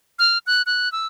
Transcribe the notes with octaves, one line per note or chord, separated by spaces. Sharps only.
F6
F#6
F#6
E6